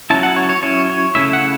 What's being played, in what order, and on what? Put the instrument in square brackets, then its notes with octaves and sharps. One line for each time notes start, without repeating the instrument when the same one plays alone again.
[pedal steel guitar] F#3 C#4 E4 A5
F#5
C#5
C#5
F#3 C#4 E4 C#5
C#5
C#3 A3 C#4 E4 E5
F#5